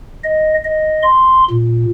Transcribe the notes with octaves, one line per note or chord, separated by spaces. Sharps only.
D#5
D#5
C6
A#2